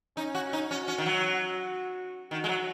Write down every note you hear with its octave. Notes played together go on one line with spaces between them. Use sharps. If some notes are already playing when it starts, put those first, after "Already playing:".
C#4 D#4
F#4
D#4
C#4 F#4
C#4
D#3
F#3
F#4
D#3 F#4
G#3
F#3